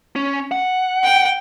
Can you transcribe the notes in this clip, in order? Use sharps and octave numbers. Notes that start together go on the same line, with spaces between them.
C#4
F#5
G5